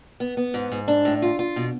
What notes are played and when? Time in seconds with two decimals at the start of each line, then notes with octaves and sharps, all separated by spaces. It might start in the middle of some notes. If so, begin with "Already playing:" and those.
0.20 B3
0.37 B3
0.54 G#2
0.72 G#2
0.88 D4
1.05 A2
1.22 F4
1.39 F4
1.56 B2